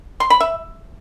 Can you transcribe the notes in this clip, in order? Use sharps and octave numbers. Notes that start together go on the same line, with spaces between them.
C6
B5
E5